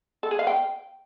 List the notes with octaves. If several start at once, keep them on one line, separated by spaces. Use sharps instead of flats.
A4
G#4
F5
G5